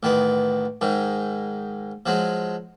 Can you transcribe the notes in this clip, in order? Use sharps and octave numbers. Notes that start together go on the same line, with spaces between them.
A1 D#3 B3
G#2 D#3
F3 F#3 G#3